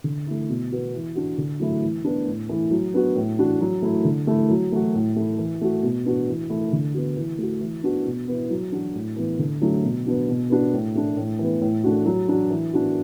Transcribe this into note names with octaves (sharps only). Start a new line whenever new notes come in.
D3
A3 E4
B2
B3 F#4
E3
D4 F#4
D3
F#3 A3 E4
E3
B3 D4
A2
E3 A3 E4
F#3
B3 D4 F#4
A2
E3 D4 F#4
F#3
A3 E4
D3
A3 E4
F#3
A3 F#4
A2
A3 E4
E3
A3 F#4
B2
B3 D4 F#4
E3
A3 E4
D3
B3 F#4
E3
A3 F#4
E3
B3 D4 F#4
B2
B3 E4
F#3
D4 F#4
A2
E3 B3
D3
F#3 A3 D4 F#4
B2
B3 D4 F#4
B2
B3 D4 F#4
A2
A3 D4
A2
E3 B3
A2
A3 D4 F#4
F#3
D4 F#4
E3
B3 D4 F#4